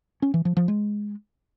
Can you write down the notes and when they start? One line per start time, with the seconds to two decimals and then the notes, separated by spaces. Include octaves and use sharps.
0.22 C#4
0.34 E3
0.45 F3
0.57 F3
0.68 G#3